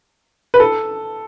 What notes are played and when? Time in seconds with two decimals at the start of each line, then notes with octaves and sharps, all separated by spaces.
0.54 B4
0.60 A4